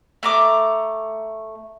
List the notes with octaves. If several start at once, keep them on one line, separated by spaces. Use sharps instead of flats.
A3 A#5 D6